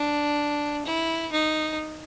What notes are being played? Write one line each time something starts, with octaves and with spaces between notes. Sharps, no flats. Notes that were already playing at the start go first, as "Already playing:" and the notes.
Already playing: D4
E4
D#4